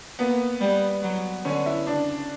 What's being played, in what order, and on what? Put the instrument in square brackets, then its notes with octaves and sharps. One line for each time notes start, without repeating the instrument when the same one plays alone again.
[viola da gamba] A#3 [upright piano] B3
[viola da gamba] G3
F#3
[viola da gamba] D3 [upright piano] C#4
[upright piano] E4
[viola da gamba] C#3 [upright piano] D4